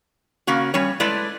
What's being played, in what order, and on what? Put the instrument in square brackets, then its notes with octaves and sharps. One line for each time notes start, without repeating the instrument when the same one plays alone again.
[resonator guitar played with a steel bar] C#3 A#3 C#4 F#4
G3 C#4 C#5
G#3 A3 E4 B4 D5